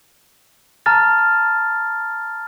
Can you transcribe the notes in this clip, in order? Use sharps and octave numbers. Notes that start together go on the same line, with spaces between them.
A5 A#5 F6 A6